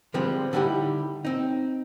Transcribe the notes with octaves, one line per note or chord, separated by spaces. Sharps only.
D3 F3 G3 G#3 C4
D3 G3 D#4 E4 G4
C4 D#4